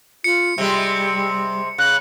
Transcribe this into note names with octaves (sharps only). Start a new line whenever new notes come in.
F4 C#7
C3 G3 G#3
C#3 F#6